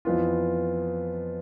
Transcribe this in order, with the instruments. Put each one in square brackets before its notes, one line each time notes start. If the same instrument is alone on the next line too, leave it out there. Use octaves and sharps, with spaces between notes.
[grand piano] F2 E3 B3 F4